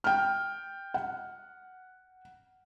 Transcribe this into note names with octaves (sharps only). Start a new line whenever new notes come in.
G5 F6
F#5